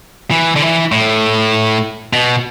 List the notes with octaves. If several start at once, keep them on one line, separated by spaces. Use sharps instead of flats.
E3
D3
E3
A2
B2